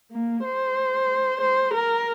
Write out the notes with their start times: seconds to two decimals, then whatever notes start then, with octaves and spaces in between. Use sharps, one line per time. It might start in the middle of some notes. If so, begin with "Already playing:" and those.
0.12 A#3
0.45 C5
1.41 C5
1.74 A#4